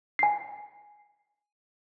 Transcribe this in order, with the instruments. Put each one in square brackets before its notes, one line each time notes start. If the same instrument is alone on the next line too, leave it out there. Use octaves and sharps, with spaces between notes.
[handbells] G#5 C7